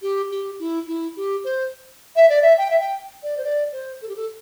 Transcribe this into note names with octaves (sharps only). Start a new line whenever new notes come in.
G4
G4
E4
E4
G4
C5
E5
D5
E5
G5
E5
G5
D5
C5
D5
C5
A4
G4
A4